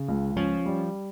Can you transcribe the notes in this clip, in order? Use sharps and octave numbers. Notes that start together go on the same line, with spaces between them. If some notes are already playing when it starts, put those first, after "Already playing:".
Already playing: C#3
C#2
F3 C#4
G3